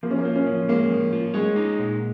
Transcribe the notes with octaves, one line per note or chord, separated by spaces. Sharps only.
F3 A#3
C#4
A#3
F4
C#4
F3
G#3 A#3
F3
F4
G#3 C#5
D#4
A#2